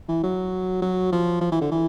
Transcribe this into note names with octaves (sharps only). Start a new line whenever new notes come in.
E3
F#3
F#3
F3
F3
E3
D3
E3